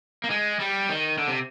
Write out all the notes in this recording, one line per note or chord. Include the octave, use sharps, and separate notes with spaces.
A#3
G#3
G3
D#3
D3
C3